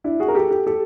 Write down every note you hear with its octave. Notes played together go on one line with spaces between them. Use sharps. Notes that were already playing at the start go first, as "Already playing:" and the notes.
D4 E4
F#4 G#4
A#4
G4 A4
G4 A4
G4 A4